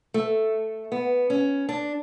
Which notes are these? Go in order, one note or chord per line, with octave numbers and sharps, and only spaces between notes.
A3
B3
C#4
D4